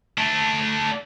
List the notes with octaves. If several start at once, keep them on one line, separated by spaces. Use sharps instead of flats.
A3 D4